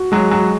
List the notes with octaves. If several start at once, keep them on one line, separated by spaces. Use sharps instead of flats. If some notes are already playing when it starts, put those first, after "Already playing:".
Already playing: F#4
F#3 G#3
F#3